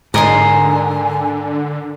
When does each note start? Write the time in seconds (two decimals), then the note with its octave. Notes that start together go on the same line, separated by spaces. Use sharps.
0.14 G#2 D3 A#4 D#5 G#5 C6